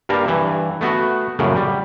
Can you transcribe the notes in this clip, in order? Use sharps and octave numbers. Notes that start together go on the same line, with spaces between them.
G2 G3 A#3 A5 A#5
G2 E3
A3 B3 F#4
A#1 F#2 A2 C#3
G3